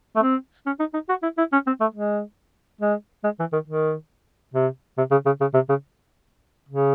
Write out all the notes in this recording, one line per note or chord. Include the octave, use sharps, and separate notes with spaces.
A3
C4
C#4
D#4
D#4
F#4
E4
E4
C#4
C4
A3
G#3
G#3
G#3
E3
D#3
D#3
C3
C3
C#3
C#3
C#3
C3
C#3
C#3